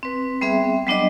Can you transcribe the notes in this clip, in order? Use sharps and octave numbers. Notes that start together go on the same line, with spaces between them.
C4 B4
G3 B3 C4 G#4 E5
F#3 G3 B3 D4 D5 D#5